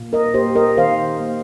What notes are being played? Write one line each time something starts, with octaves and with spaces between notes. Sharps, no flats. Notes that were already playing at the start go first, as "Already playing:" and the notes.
Already playing: A#2 A#3
A#4 D#5
A#3 G4 C5
A#4 D#5
D#3 C5 F5
A#3